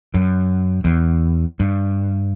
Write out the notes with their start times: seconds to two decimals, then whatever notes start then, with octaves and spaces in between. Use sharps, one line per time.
0.14 F#2
0.85 E2
1.60 G2